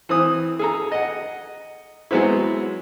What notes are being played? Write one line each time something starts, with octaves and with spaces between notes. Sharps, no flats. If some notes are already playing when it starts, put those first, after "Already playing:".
E3 C4 D#6
G#4 A4 A#5
D#5 F#5
F#3 G#3 B3 C4 E4